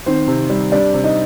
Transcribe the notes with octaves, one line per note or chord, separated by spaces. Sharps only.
D#3 C4 C5
C3
G3
G3 D4 D5
C3
D#4 D#5